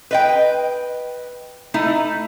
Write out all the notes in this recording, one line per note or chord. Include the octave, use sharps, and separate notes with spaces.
B4 D#5 G5
A3 D#4 E4